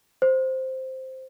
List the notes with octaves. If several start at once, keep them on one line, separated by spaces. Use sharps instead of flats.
C5